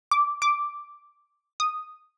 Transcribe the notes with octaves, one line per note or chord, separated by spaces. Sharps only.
D6
D6
D#6